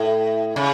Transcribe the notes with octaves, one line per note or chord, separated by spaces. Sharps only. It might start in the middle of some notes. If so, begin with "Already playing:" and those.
Already playing: A2
C#3